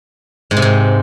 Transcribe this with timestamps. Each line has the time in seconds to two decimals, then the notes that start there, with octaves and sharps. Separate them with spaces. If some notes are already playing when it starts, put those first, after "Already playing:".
0.51 G#2
0.57 C3
0.62 G#2